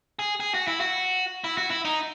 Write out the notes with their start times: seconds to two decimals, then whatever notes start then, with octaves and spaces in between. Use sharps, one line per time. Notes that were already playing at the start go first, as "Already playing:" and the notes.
0.19 G#4
0.40 G#4
0.54 F#4
0.68 E4
0.80 F#4
1.44 E4
1.58 F#4
1.71 E4
1.85 D#4